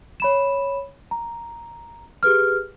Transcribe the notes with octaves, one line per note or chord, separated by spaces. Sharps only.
C#5 B5 E7
A#5
G4 G#4 B4 F6